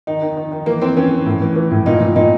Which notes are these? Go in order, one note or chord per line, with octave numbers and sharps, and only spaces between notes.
D#3 D#4
D#3
D#3
D#3
E3 A#3
E3 C4
E3 C#4
E3
A2
E3
E3
A2
A#2 D#4
A#2
A#2 D#4